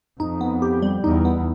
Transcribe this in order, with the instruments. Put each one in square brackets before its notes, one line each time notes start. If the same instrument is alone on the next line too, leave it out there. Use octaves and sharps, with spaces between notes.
[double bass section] F2 [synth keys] D#4
[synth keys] B3
G4
G3
[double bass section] E2 [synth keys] D#4
[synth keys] B3